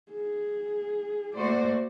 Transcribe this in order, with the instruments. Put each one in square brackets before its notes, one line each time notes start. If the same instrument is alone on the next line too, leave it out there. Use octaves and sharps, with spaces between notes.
[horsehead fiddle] G#4
[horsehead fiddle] A3 A#3 [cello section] F#4 C5 D5